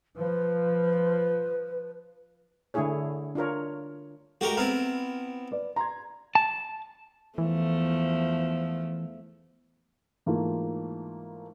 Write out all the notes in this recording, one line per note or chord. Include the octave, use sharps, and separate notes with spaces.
F3 B4
D3 A3 D4 E4 G#4 C#5
D4 F4 A#4 C#5
G#3 A3 F#4 G4 A#4
B3 C4 E4 A#5 F6
B4 D5
A#5 C6 G#6
A5
E2 E3 F3 A3
G#2 E3 A3 A#3 F4